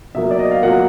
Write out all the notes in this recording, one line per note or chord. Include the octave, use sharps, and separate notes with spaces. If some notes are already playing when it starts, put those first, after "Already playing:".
B2 F#3 A#3 E5
D5
D#5
F5
B2 F#3 A#3 F#5